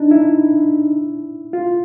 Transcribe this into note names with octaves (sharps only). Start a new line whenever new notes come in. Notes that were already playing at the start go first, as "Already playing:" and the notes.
Already playing: D4 D#4
E4
F4